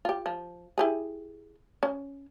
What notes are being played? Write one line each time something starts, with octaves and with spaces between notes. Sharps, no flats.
F4 G4
F3
E4 G4 G#4
C#4